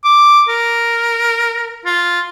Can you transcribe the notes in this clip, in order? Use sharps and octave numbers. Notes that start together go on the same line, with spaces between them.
D6
A#4
F4